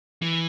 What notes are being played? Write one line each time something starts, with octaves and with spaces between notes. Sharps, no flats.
E3